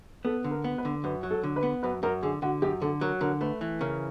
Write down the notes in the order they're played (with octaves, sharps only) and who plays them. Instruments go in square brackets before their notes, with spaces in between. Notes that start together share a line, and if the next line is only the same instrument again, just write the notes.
[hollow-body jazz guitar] B3 [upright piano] A4
[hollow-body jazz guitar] D3
[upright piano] A#4
[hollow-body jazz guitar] B3
[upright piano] B4
[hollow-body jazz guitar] D3
[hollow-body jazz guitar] F#2 [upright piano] B4
[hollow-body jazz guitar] F#3
[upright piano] A4
[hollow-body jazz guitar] D3
[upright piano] B4
[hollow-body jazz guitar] B3
[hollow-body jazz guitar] F#2 [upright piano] B4
[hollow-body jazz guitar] F#2 [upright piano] A#4
[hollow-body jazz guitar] D3 [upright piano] G#4
[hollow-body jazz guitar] D3 [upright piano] F#4
[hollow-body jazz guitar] F#2 [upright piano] G4
[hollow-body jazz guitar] D3 [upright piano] A4
[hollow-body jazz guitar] F#3 [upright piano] A#4
[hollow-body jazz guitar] D3 [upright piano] A#4
[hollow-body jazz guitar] A3 [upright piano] B4
[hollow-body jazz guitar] E3
[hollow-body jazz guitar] C#3 [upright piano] A#4